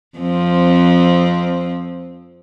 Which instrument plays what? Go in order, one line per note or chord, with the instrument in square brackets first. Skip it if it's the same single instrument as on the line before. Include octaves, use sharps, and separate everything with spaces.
[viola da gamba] F2 F3 C4